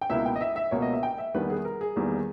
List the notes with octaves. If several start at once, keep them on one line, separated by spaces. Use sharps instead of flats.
G5
C#2 B2 A#3 E4 E5
G5
D#5
E5
E5
C#2 B2 A#3 C#5
D#5
E5
G5
E5
E2 D#3 G3 B3 B4
G#4
A#4
G#4
E2 D#3 G3 A#3